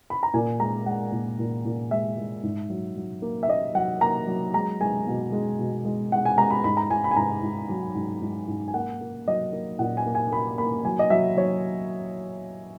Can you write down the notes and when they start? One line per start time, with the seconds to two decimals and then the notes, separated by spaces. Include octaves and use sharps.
0.10 B5
0.23 A#5
0.34 A#2 G#5
0.59 G#3 A#5
0.86 G#3 F#5
1.12 A#2
1.39 A#2
1.65 A#2
1.91 G#3 E5
2.18 G#3
2.43 G#2
2.70 F#3
2.96 F#3
3.22 A#3
3.43 E5
3.48 A#3 D#5
3.75 F#3 F#5
4.01 A#3 A#5
4.27 F#3
4.54 G#3 A#5
4.81 G#3 G#5
5.07 B2
5.32 G#3
5.59 B2
5.85 G#3
6.12 G#3 F#5
6.25 G#5
6.38 G#3 A#5
6.50 B5
6.64 G#2 B5
6.77 A#5
6.90 G#2 G#5
7.04 B5
7.11 G#5
7.16 G#2 A#5
7.43 G#2
7.69 F#3
7.95 G#2
8.22 G#2
8.48 G#2
8.68 G#5
8.74 A#3 F#5
9.01 A#3
9.28 F#3 D#5
9.53 A#3
9.79 A#2 F#5
9.97 G#5
10.06 A#3
10.15 G#5
10.31 A#3 B5
10.58 A#3 B5
10.85 F#3 G#5
10.99 D#5
11.10 F#3 E5
11.37 F#3 C#5